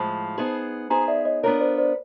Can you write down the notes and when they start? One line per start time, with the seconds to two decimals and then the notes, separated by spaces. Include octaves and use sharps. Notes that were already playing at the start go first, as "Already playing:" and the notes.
Already playing: A2 F3 G#3 A5 B5
0.38 B3 D#4 G#4 C5
0.90 B3 D#4 G#4 C5 G#5 A#5
1.08 D5 E5
1.25 C#5 D#5
1.43 B3 D4 F4 A#4 C#5
1.60 C5 D5
1.78 C5 D5